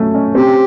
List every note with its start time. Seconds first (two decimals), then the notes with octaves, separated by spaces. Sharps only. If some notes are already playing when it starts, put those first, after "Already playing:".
Already playing: F#3 A3 C#4
0.14 C#4
0.35 C4 G4